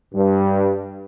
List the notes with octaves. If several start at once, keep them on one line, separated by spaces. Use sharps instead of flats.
G2